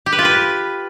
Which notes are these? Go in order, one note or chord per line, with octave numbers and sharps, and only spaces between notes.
G4
B4
F4
B4